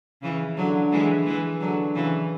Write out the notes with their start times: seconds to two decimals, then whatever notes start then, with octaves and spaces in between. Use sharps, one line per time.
0.22 C#3 E3
0.57 D3 F#3
0.91 E3 G#3
1.25 E3 G#3
1.60 D3 F#3
1.95 C#3 E3